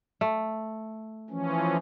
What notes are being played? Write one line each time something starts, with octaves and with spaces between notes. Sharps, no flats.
A3
E3 F3 C#4